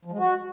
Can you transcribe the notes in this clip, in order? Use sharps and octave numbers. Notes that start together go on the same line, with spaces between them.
F3
G#3
F#4